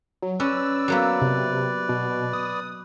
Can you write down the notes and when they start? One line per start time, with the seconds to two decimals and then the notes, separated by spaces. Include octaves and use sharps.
0.22 F#3
0.40 C#4 B4 D5 E6
0.88 F#3 A#3 B3
1.21 C3
1.89 B2
2.33 D#6